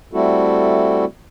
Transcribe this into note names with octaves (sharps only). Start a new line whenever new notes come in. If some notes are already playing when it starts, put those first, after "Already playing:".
G3 A3 C4 E4 F#4 A4